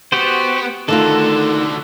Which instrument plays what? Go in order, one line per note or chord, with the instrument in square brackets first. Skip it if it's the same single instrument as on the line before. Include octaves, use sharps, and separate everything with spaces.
[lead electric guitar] B3 [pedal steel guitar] F#4 G4 C5
[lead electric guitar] D3 F#4 [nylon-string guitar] D#3 A3 F4 [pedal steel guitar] A4